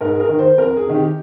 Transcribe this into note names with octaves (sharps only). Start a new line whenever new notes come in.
G#2 A#4
G#4
A#4
D#3
C5
F2 A#4
G#4
C3 D#3
G4